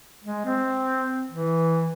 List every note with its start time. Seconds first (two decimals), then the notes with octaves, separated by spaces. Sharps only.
0.24 G#3
0.45 C4
1.31 E3